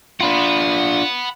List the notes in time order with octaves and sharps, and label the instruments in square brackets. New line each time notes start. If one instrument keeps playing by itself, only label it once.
[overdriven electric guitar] D4 F4 [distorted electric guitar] F#5 B5